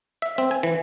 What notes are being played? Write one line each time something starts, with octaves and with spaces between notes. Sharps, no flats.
E5
C4
G#5
E3